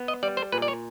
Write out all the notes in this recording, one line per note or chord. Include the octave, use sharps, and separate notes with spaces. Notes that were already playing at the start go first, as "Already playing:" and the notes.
Already playing: B3
D#5
G3 D5
C5
A#2 B4
D5
C#5